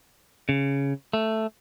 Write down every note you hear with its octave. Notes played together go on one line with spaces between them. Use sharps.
C#3
A3